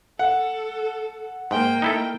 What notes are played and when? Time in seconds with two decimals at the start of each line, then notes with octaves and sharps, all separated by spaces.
0.19 A4 F#5
1.51 G#2 A#3 G5
1.82 D#4 E4 A4